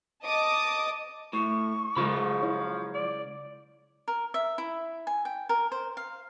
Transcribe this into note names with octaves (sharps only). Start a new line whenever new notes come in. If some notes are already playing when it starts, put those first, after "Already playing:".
D#5 A5 D6 D#6
A2 C#6
C#3 F3 F#3 G#3 F4 B5
E4 C#5
D5
A#4
E5
E4
G#5
G5
A#4
C5
F5